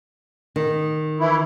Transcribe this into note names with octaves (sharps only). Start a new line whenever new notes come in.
D#3
E3 E4